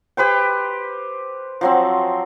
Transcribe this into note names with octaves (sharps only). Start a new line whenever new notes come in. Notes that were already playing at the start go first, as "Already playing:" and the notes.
G4 B4 C5 G5
F3 F#3 C4